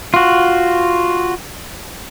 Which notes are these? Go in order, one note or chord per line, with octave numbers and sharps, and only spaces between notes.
F4 F#4